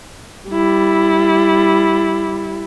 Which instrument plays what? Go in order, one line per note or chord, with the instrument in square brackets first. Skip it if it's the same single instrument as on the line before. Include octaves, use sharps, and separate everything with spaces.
[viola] G3 E4